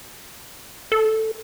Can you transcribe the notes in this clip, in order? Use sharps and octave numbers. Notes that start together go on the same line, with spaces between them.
A4